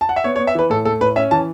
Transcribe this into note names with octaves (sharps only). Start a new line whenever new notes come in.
A5
F#5
E5
B3 C#5
C#5
B3
E5
E3 B4
A2 A4
A3 A4
A2 B4
C#4 E5
E3 A5